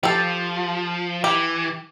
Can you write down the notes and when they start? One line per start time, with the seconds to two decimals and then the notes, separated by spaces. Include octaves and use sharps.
0.03 F3 G4 A4
1.24 E3 G4